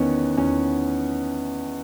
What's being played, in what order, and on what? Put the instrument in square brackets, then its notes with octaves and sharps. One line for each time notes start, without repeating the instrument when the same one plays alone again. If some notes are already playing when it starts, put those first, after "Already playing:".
Already playing: [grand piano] E2 D#3 B3 C#4
E2 C#4